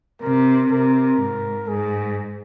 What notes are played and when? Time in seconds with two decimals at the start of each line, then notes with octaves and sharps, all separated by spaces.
0.21 C3 A#4
0.70 C3 A#4
1.19 G#2
1.68 G#2 G#4